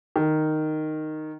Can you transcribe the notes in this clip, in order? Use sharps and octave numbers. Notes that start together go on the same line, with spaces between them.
D#3